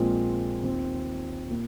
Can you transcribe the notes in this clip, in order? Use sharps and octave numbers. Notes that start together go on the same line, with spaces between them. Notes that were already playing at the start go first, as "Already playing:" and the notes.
Already playing: A#1 A#2 G#3 C4 F4
D#2 D#3 C4 F4
A#2 A#3